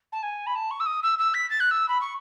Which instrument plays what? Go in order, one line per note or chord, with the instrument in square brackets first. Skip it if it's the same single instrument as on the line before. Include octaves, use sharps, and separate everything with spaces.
[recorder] A5
G#5
B5
A5
C#6
E6
D#6
E6
E6
B6
A6
F#6
E6
B5
C#6